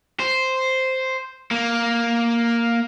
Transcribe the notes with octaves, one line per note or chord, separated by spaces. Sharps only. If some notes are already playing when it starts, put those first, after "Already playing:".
C5
A#3